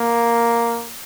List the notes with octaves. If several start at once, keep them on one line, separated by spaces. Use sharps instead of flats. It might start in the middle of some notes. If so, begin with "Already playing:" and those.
Already playing: A#3